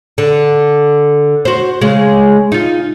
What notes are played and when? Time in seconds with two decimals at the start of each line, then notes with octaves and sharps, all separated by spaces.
0.18 D3
1.45 F#4 C5
1.81 C#3 G#3
2.52 D#4 F4